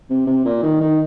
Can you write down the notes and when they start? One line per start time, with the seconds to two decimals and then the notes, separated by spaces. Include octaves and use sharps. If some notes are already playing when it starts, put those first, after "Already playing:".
0.10 C3
0.27 C3
0.45 A#2
0.63 D#3
0.81 D#3